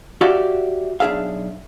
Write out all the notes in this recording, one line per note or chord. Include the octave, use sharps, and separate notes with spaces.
F#4 G4 D5 E5 F5
B1 D4 G#4 E5 F5